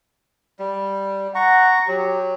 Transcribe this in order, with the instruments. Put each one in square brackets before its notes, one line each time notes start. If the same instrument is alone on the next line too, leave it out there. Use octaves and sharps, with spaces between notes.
[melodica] G3
[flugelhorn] F#5 [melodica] A#5 C#6
[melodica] F#3 [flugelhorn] G4